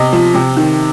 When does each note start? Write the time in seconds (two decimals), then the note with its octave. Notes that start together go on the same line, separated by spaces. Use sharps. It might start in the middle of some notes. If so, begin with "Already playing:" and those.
Already playing: C3 D#5
0.13 F3
0.34 C3
0.57 D#3